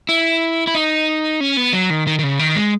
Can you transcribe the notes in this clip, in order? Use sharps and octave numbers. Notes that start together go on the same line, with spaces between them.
E4
E4
D#4
C#4
B3
F#3
D#3
D#3
D#3
C#3
D#3
G#3